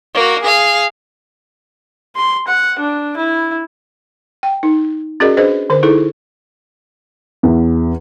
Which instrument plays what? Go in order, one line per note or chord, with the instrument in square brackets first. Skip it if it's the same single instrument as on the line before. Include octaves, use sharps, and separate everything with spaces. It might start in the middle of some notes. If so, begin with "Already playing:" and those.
[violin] A#3 F#4
G#4 F5
[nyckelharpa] C6
F#5
D4
E4
[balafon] G5
D#4
C#4 F#4 G#4 A#4 D5 D#5
D4 G#4 B4 C5 D#5
D3 A#4 C5
D#4 E4 G#4 A4
[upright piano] E2